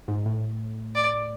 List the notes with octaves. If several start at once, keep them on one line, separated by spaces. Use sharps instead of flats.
G#2
A2
D5